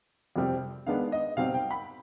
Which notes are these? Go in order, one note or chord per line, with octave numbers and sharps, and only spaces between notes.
F2 C3 G3 C4
D#3 G#3 B3 D4 F5
D#5
B2 G3 C4 D#4 F5
G5
B5